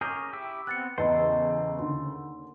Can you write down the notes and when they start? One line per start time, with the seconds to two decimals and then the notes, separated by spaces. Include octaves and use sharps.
0.01 C#4 G#4 A#4 C#6 D6 G6
0.33 E4 G4 E5
0.67 B3 C4 F#6 A6 C#7
0.98 E2 C#3 A4 B4 C5 D#5 B5
1.79 D#2 D3 C6